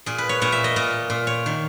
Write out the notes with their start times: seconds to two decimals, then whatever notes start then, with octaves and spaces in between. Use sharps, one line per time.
0.06 A#2 G#4
0.18 B4
0.29 C#5
0.41 A#2 C#5
0.52 E5
0.64 D#5
0.76 A#2
1.10 A#2
1.27 C#5
1.46 D#3